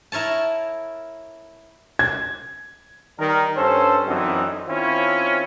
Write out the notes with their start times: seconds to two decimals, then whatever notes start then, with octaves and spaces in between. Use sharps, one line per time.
0.12 E4 A#4 C#5 A5
1.99 G#6
3.18 D#3 G3 A#4
3.56 G2 C#4 A4 C5
4.06 F#2 D3 E3 C4 D#4
4.68 D#3 C4 C#4 E4 F4